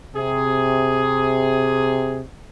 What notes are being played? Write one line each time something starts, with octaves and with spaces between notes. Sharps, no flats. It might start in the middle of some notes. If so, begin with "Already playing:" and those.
C3 G#4